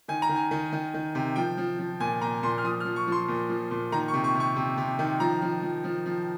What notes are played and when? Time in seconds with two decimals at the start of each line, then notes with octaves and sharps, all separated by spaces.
0.08 D#3 G#5
0.22 A#5
0.29 D#3
0.36 G#5
0.51 D#3
0.72 D#3
0.94 D#3
1.15 C3
1.36 F3 G5
1.57 F3
1.79 F3
2.00 A#2 G#5
2.21 A#2 A#5
2.43 A#2 C6
2.58 F6
2.64 F3 D#6
2.80 F6
2.85 F3
2.96 C#6
3.07 F3 C6
3.28 A#2
3.49 F3
3.71 A#2
3.92 D#3 A#5
4.08 C#6
4.13 C3
4.24 C#6
4.35 C3
4.40 C#6
4.56 C3
4.77 C3
4.99 D#3
5.20 F3 A#5
5.42 F3
5.63 F3
5.84 F3
6.06 F3